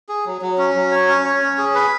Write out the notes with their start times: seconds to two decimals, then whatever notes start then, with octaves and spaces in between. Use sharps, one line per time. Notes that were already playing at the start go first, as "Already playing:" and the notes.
0.09 G#4
0.26 F#3
0.42 F#3
0.58 C#4
0.75 F#3
0.91 C#5
1.08 C#4
1.25 C#5
1.42 C#4
1.58 G#4
1.75 B4